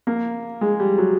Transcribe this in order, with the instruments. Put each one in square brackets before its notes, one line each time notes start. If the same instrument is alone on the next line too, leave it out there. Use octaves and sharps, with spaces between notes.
[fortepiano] A#3
G#3
G3
F#3